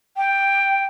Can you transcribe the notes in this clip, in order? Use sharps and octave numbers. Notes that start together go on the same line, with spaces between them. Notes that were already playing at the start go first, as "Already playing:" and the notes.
G5